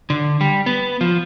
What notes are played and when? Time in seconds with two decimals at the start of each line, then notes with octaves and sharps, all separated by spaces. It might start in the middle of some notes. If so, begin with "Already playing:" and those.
0.10 D3
0.41 G3
0.66 B3
1.01 F3